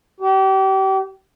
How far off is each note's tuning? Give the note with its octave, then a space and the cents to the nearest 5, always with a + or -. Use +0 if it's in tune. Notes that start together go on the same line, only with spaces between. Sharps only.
G4 -35